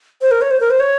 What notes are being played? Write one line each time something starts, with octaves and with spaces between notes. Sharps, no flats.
C5
A#4
C#5
C5
A#4
C5
C#5